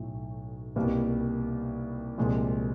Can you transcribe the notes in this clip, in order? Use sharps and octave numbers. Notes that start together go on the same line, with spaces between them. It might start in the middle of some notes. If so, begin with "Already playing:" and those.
Already playing: B1 A2 F#3 A3
C2 B2 G3 A#3
C2 A#2 F3 G#3